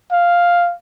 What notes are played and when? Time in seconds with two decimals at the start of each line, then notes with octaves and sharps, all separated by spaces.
0.11 F5